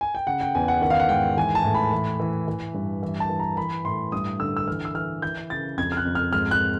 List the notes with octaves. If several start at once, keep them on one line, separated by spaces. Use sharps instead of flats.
G#5
G5
C#3 F#5
G5
E2 G#5
F#5
D#3 F#5
F5
F#5
G#2 G5
E3 G#5
A5
A2
B5
E3
E3
E3
G2
E3
A5
E3
A#5
E3 B5
A2 C6
G2 D#6
D3 E6
E6
E3 F6
E6
E3 F6
E3 G6
C#3 A6
F2 G#6
F6
F#6
F2
F6
G#2 F6
F#6